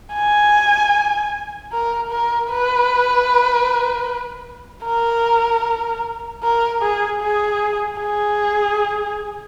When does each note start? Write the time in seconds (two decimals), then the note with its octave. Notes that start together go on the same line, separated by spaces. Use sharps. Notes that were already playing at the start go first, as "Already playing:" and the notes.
0.14 G#5
1.72 A#4
2.11 A#4
2.50 B4
4.86 A#4
6.43 A#4
6.82 G#4
7.21 G#4
8.00 G#4